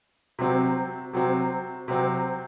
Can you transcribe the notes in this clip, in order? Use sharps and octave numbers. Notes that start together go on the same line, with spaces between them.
C3 F#3 C4
C3 F#3 C4
C3 F#3 C4